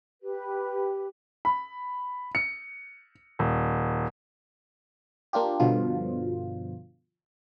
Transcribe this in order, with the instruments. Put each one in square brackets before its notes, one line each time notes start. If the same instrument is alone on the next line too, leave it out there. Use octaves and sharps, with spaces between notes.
[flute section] G4 B4
[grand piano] B5
C#7
D#1
[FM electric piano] A#3 D4 F4 G4
G2 B2 D3 F3 F4